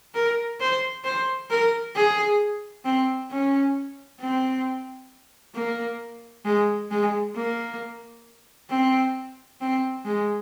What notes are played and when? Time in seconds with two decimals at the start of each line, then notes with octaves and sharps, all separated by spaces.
0.14 A#4
0.60 C5
1.04 C5
1.50 A#4
1.95 G#4
2.85 C4
3.31 C#4
4.20 C4
5.55 A#3
6.45 G#3
6.91 G#3
7.35 A#3
8.70 C4
9.61 C4
10.05 G#3